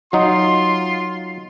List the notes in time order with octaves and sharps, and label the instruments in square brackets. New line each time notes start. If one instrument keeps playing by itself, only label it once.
[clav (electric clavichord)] F#3 D#4 [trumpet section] F4 C6